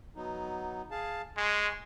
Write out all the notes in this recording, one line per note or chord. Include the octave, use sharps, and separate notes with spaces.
F#3 B3 D#4
G#4 F5 A5
G#3 G#5 C6 C#6